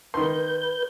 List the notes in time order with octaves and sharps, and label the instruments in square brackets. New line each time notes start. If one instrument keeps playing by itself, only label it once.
[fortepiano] D#3 C6 [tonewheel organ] B4 G6